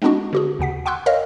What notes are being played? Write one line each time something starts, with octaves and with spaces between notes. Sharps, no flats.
G#3 B3 C4 D4 E4 F#4
D3 F#4 G#4
D#2 C#3 F#5 B6
F#5 G5 C6 C#6 E6 F#6
A#4 C#5 D#5 F5